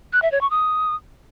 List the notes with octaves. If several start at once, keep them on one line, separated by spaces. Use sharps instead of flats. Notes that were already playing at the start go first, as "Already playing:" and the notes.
F#6
E5
C#5
C#6
D#6